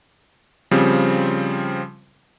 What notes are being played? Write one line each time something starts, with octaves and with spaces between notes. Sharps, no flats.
C#3 F3 G3 C4